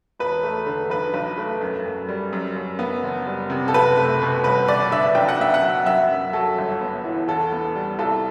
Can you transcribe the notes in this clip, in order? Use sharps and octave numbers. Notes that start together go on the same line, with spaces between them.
E1 B4
A3
D3
B1 B4
B1
A3
F#2
F#2
G3
F#2
F#2
B3
F#1
G3
C3
A4
F#1 B4
A3
B2
G1 B4
G1 D5
D3 E5
B1 G5
F#5
B3 E5
F#5
F#3
F#2 E5
F#2
F#3 A4
G1
B3
E3
E2 A4
B3
G3
C2 A4